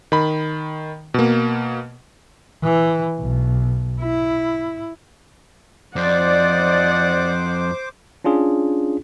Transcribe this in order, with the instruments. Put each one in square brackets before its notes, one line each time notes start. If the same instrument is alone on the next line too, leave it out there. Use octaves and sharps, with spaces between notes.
[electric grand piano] D#3 B5
B2 A#3
[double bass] E3
B1
E4
[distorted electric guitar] F2 [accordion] C5 D6 [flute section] D5 [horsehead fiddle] D#5 F#5
[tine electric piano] C#4 D4 F4 G#4